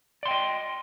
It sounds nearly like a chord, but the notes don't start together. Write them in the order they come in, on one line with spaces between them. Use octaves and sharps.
D5 C6 G5 D#5